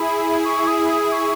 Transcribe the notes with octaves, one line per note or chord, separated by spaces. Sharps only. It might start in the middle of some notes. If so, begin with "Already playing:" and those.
Already playing: E4 G#4 B5
E4 G#4
E4 G#4 C#6
D#6
D#6
C#6